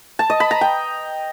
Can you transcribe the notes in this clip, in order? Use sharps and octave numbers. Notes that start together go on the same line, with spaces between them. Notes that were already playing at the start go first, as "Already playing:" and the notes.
A5
D#5
B5
A#5
G5